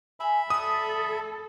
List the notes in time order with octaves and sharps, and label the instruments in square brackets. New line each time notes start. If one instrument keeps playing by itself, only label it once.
[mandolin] G#4 G#5 [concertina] E5 B5
[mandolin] F#4 C#5 D5 [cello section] A4 [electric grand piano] D#6